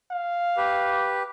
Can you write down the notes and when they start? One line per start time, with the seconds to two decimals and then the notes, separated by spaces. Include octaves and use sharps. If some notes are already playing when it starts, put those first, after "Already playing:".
0.11 F5
0.57 G4 B4